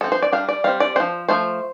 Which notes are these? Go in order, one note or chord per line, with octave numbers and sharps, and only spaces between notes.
F3 C4 A4
C5
D5
G3 D4 F5
D5
G3 C4 F5
D5
F3 C4 C5
F3 A3 C5